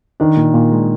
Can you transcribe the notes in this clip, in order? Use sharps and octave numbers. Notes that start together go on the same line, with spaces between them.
D#3 D4
A#2
A#2
G#3